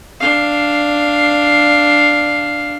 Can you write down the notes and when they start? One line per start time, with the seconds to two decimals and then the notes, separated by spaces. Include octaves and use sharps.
0.20 D4 F5